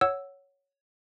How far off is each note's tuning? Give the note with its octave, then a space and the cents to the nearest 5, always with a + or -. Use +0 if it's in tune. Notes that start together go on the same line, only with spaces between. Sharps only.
C#5 +5 F#5 +0 E6 +0